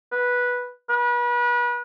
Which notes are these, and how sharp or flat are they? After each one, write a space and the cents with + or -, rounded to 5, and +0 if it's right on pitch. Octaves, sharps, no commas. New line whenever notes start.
B4 -10
B4 -35